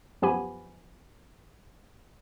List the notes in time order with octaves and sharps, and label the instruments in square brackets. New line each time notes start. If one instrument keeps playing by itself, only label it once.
[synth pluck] F#2 F3 B3 G4 G#5 B5